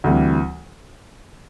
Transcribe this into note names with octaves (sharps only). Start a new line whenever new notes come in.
D2 C3 E3 G3